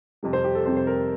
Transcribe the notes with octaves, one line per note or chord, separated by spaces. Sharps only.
F2 C3 G3
C5
G4
A4
F2 C3 G3 C5
C5
A#4